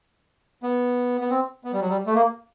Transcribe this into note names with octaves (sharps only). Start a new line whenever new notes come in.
B3
B3
C4
B3
G3
F#3
G3
A3
A#3